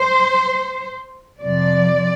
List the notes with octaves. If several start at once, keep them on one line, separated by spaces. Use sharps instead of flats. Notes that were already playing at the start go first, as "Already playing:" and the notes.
Already playing: C5
F2 C3 F3 D5